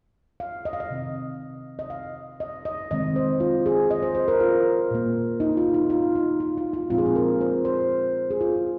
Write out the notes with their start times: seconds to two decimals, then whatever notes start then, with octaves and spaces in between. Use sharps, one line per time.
0.40 F5
0.65 D#5
0.73 F5
0.80 D#5
0.90 C3 D#3 C4
1.79 D#5
1.90 F5
2.40 D#5
2.65 D#5
2.90 C3 D#3 G#3 C4 D#5
3.16 C5
3.40 F4
3.66 G#4
3.90 D#5
4.02 C5
4.15 C5
4.28 A#4
4.40 F4
4.91 A#2 A#3
5.40 D#4
5.57 F4
5.74 D#4
5.90 F4
6.15 D#4
6.40 F4
6.57 F4
6.73 F4
6.90 A#2 F3 G#3 C4 F4
6.98 G#4
7.06 F4
7.16 A#4
7.41 C5
7.65 C5
8.31 G#4
8.41 F4